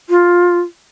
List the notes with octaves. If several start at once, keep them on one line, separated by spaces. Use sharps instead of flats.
F4